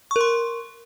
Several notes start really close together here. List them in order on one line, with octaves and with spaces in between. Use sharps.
C#6 A#4 C6